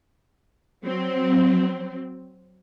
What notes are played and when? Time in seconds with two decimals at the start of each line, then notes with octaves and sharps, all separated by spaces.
0.84 F#3 C4